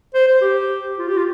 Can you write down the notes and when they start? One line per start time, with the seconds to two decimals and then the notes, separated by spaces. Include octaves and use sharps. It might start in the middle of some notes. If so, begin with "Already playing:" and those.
0.14 C5
0.27 C5
0.41 G4
0.98 F4
1.08 G4
1.17 F4